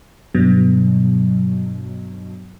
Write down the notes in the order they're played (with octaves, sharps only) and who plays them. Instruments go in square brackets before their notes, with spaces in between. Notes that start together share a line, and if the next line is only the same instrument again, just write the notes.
[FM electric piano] G2 B2 F#3